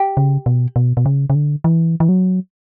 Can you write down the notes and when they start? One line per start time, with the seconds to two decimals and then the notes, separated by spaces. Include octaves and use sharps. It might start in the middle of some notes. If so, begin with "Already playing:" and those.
Already playing: G4
0.17 C#3
0.46 B2
0.76 B2
0.97 B2
1.06 C#3
1.30 C#3
1.35 D3
1.64 E3
2.00 E3
2.09 F#3